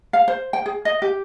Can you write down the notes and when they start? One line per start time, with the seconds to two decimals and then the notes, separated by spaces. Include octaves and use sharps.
0.13 F5
0.28 C5
0.53 G5
0.66 G#4
0.85 D#5
1.02 G4